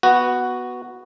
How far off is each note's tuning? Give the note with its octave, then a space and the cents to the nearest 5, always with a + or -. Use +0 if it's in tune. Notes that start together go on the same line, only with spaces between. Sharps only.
B3 +0 F#4 +0